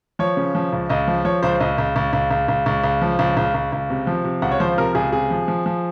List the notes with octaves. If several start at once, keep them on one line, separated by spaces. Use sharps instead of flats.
F3 C#5
C#3
F3
C#2
C#2 D#5
F3
F3 C#5
C#2 C5
C#2 D#5
C#2
C#2
C#2
C#2
C#2
C#2
C#2
F3
C#2
C#2
C#2
C#2
C3
F3
C3
C#2 F#5
C#5
F3 C5
C3 A#4
C#2 G#4
C3 G#4
F3
F3
F3